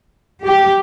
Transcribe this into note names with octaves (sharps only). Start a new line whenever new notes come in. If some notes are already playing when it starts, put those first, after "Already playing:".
G4